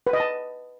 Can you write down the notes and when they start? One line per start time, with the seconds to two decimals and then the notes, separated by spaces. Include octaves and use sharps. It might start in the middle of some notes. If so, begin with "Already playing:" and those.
0.07 B4
0.13 D#5
0.20 A5